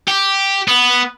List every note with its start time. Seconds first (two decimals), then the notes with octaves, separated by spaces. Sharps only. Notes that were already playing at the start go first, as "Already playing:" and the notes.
0.08 G4
0.68 B3